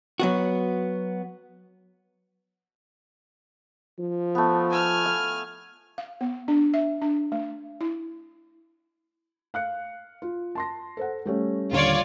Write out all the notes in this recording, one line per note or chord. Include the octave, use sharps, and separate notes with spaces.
F#3 B3 F#4
F3
A3 B3
G#5 F6
F5
F5
B3
D4
E5
D4
A3
E4
F5 F#6 C#7
F4
A5 C6 A#6
A4 C5 F#5
G3 A3 C#4
D#1 D3 F4 C#5 D5